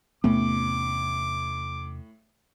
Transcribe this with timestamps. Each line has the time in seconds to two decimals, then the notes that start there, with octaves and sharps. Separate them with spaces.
0.24 E2 A2 C3 A3 B3 C#4 D6